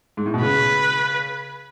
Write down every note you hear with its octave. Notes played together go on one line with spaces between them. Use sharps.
G#2
A2
B2
C#3 B4